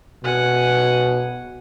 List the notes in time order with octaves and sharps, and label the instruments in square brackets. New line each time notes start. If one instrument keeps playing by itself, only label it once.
[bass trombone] B2 [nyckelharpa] F#5 G#5